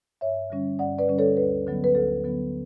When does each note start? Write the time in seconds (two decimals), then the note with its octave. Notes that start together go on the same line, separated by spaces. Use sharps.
0.21 G2 C#5 E5
0.50 D3 G3 C#4
0.79 G2 D5 F#5
0.99 B4 D5
1.08 D3 G3 C#4
1.18 A4 C#5
1.37 D2 B4
1.66 D3 F#3 B3
1.84 B4
1.95 D2 A4
2.24 D3 F#3 B3